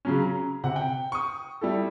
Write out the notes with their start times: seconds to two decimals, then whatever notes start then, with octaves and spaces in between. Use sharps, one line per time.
0.05 C#3 F#3 C#4
0.22 A#5
0.64 C3 F#5
0.76 G5
1.12 C#6 D#6
1.61 G3 E4 A4